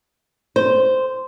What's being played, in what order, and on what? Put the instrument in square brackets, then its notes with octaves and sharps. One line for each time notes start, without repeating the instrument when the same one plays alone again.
[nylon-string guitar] C5